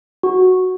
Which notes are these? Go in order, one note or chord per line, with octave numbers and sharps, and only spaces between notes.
F#4